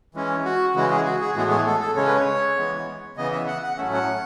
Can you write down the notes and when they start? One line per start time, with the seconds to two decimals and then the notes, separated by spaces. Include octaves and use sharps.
0.15 E3 G#3 C#4
0.45 F#4
0.75 C#3 E3 G#3 F#4
0.90 G#4
1.05 F#4
1.20 G#4
1.36 A2 E3 G#3 B3 F#4
1.51 G#4
1.66 A4
1.81 A4
1.96 C#3 G#3 C#4 C#5
2.07 B4
2.16 C#5
2.57 E3 G#3 B3
3.17 C#3 E3 B3 D#5
3.32 E5
3.47 F#5
3.63 F#5
3.78 A2 F#3 A3 C#4 E5
3.93 F#5